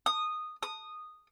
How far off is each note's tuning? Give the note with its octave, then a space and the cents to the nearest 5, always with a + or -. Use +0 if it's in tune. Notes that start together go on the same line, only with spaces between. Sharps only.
D#6 -10
D#6 -10